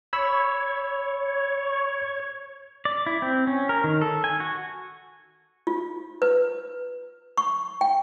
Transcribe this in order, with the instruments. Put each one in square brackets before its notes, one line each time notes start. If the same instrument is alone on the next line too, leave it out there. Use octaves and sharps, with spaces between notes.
[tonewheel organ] C#5 [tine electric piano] B5 E6
[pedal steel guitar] D5
E4
C4
C#4
A#4
D#3
A4
G#5
F#4
[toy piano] F4
B4
C#6
G5